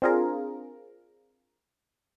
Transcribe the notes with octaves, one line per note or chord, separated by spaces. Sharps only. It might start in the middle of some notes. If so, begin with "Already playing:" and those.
C4 D4 F4 G#4 A#4